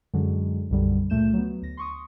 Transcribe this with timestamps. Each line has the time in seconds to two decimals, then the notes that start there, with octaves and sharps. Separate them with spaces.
0.14 F#2 D3 F#3 G#3
0.70 B1 F#2 D3 G3
1.10 C#2 A#2 A3 G6 E7
1.33 F#3 B3
1.62 D2 A#6
1.77 C6 C#6 D#6